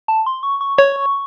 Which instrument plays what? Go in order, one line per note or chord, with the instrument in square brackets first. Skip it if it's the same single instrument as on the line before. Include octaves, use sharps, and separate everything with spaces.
[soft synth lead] A5
C6
C#6
C#6
[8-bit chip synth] C#5 [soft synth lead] C#6